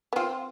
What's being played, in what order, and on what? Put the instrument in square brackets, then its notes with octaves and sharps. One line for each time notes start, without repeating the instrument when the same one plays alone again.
[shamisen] B3
[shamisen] C4 [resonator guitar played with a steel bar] F4